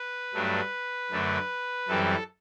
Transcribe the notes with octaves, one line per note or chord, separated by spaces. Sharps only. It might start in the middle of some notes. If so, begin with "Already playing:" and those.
Already playing: B4
G2 F#3 A3 D4
F#2 D3 A3 D4
F#2 E3 G3 C4 A4